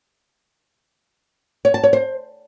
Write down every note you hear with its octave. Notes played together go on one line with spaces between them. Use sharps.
C#5
A5
C#5
C5